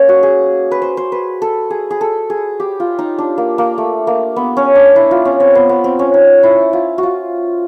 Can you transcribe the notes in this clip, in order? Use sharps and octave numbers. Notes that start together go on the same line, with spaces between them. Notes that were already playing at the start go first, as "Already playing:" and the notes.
Already playing: A#3 C#4
F#4
G#4
B4
C5
C5
B4
A4
G#4
G#4
A4
G#4
G4
F4
D#4
D4
A#3
A#3
A3
A#3
B3
C#4
D4
E4
F4
C#4
C4
B3
B3
C4
C#4
D#4
E4
F4
F#4
F4